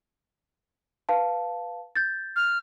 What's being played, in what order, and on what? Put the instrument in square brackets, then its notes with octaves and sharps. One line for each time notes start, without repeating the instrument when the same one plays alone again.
[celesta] B4 F5 A5
G6 A6
[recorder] F6